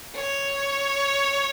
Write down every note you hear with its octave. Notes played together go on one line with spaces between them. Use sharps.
C#5